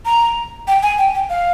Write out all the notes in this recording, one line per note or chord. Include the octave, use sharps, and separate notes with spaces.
A#5
G5
G#5
G5
G5
F5